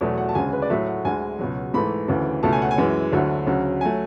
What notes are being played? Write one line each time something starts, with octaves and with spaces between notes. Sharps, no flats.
E2 B2 F#3 A3
F#5
A5
D2 C#3 G#3 G#5
B4
D5
A2 F#3 A3 E5
F#5
D2 D3 G#3 G#5
C#2 B2 F#3
G#2 E3 A3 B5
D2 C#3 E3 A3
C#2 B2 A3 A5
G#5
F#5
G#5
F#2 E3 G#3
D2 D3 F#3 A3
D2 C#3 F#3
F#3 A3 G#5